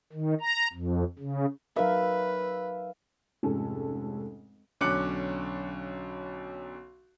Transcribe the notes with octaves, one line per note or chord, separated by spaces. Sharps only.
D#3
A#5
F2
C#3
F#3 D#4 A#4 B4 E5 F5
F1 G#2 C#4 A4
B1 D3 C#4 D6 F#6 C#7